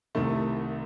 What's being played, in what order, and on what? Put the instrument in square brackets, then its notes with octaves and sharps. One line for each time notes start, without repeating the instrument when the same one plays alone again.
[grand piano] C2 C3 D#3 A3